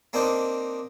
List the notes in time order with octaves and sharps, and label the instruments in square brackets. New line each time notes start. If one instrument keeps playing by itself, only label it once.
[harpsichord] A#3 C4 D4 D#4 C5